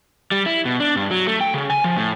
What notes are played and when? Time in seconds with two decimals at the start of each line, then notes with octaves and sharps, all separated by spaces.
0.32 G3
0.46 E4
0.65 B2
0.80 D4
0.96 G2
1.11 F#3
1.27 A3
1.41 G5
1.54 C#3
1.70 G#5
1.84 F3
1.96 A2